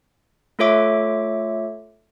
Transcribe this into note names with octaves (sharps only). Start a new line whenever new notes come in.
A3 F4 A4 C#5 E5 D6